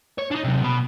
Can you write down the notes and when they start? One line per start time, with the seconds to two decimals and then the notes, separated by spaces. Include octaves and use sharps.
0.18 C#5
0.31 D4 D#4
0.44 C3 F#3
0.63 B2 B5